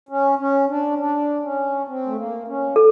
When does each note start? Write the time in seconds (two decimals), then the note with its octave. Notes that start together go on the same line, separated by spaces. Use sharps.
0.09 C#4
0.39 C#4
0.68 D4
0.98 D4
1.43 C#4
1.88 C4
2.06 A3
2.16 A#3
2.47 C#4
2.76 A4